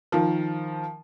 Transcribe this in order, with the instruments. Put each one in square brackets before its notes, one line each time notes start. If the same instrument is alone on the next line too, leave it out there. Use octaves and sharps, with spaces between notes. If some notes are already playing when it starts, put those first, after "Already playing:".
[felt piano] D#3 F3